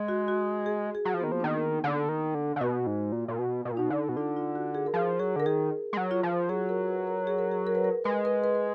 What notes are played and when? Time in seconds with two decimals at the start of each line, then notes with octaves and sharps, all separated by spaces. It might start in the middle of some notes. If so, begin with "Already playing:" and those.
Already playing: G#3
0.08 F#4
0.28 F#4
0.66 G#4
0.95 G#4
1.05 F#3 F#4
1.14 F3
1.20 B3
1.24 D#3 A#3
1.32 F3
1.40 D4
1.44 D#3 B3
1.64 D#4
1.84 D3
2.09 D#3
2.35 D3
2.56 D3
2.61 B2 F#4
2.87 G#2
3.12 A#2
3.28 A#2
3.39 B2
3.65 B2
3.72 A#2
3.77 B2 D#4
3.90 D3
4.09 B2
4.17 D3 F4
4.36 F4
4.55 F#4
4.75 G#4
4.86 A#4
4.94 F3 G#4
5.19 F#3 G#4
5.36 D3 A#4
5.46 D#3 G#4
5.93 G#3
5.97 F#3
6.11 F4
6.23 F3
6.49 F#3 G#4
6.69 A#4
6.88 B4
7.07 A#4
7.27 G#4
7.39 A#4
7.52 G#4
7.67 A#4
7.75 B4
7.84 A#4
8.04 G#3 B4
8.25 B4
8.44 B4
8.55 B4